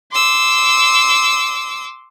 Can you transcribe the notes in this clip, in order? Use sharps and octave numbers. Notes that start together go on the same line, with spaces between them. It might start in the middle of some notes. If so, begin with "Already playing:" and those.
C6 D6 E6